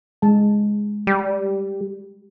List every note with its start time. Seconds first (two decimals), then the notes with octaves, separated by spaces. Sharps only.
0.22 G#3 A5
1.07 G3